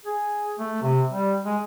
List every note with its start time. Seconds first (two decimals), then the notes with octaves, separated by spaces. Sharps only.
0.05 G#4
0.59 A3
0.82 C3
1.11 G3
1.45 G#3